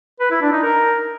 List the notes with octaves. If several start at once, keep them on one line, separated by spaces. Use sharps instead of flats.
B4
E4
D4
D#4
A#4